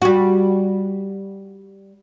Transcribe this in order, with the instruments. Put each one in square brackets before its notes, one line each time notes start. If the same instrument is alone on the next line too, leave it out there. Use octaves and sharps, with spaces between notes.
[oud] G3 F#4